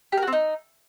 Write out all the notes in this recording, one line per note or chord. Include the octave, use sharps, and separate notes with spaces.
G4
A#4
F#4
C4
D#4